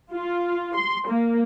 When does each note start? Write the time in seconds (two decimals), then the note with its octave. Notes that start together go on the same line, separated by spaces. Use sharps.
0.13 F4
0.76 C6
1.09 A#3